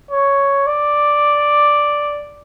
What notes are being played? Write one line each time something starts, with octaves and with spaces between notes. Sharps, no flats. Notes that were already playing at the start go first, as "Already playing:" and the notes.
C#5
D5